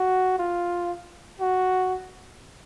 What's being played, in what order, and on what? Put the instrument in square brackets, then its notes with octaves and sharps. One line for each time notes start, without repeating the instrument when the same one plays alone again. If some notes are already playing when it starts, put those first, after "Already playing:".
Already playing: [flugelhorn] F#4
F4
F#4